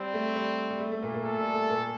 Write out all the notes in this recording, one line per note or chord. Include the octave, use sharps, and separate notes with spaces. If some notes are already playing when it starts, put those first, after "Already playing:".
Already playing: G3 C4
A3
G3
G3
A3
A3
A#2 A#3
A#2 A#3
A3 A4
G3
A3
A#2 A#3